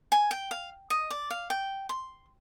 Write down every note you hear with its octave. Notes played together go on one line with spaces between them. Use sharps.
G#5
G5
F5
D#5
D5
F5
G5
C6